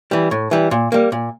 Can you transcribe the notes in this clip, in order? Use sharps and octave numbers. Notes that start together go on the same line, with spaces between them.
E3 G3
A2
E3 G3
A#2
G3 A#3
A#2